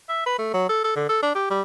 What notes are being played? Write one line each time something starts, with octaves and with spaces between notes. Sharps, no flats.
E5
B4
A3
F#3
A4
A4
D3
A4
D4
G4
G3